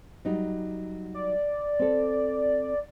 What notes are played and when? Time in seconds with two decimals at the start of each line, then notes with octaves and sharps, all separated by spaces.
0.25 F#3 G3 D#4
1.14 D5
1.79 C4 A4